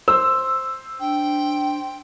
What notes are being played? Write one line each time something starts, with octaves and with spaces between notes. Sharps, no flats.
C5 E6
D4 G5